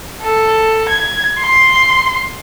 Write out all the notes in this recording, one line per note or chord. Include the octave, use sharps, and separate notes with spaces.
A4
G#6
C6